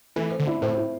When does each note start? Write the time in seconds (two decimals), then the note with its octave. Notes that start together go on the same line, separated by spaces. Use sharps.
0.16 E3 A3
0.32 C5
0.39 D3
0.47 E4
0.62 A2 C5
0.78 E4